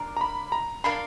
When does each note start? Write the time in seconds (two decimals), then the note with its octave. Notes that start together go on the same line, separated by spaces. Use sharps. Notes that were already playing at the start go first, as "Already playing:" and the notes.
Already playing: D4 F4 A#4
0.17 A#5
0.21 B5
0.52 A#5
0.84 D4 F4 A#4 F5 B5